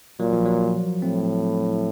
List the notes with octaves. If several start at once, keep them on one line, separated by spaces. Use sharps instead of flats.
A#2 F#3
F3
F#3
A2 C4